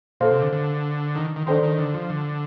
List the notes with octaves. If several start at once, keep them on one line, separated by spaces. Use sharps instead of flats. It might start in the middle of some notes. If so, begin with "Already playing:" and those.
A#2 A4 C5 F5
C3
D3
D3
D#3
D#3
D#3 D4 A4 C5 G5 C6
D#3
D3
F3
D3